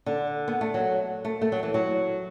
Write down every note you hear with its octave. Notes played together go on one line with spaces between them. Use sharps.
D3
B3
A3
F#3
A3
A3
F#3
E3
F#3